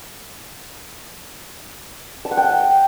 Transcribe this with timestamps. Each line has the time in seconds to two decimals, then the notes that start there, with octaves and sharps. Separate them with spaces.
2.25 A5
2.31 F#5
2.37 G5